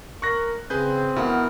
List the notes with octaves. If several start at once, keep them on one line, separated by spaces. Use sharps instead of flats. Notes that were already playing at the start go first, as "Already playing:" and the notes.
A#4 C#6 F#6 A#6
C#3 C4 G#4 B4 G6
B2 E3 B3 A#4 F#5